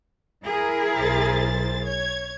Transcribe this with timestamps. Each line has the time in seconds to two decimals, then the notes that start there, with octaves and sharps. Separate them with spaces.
0.44 E4 G#4 A#4
0.99 B1 C5 A6
1.85 C#5 G#6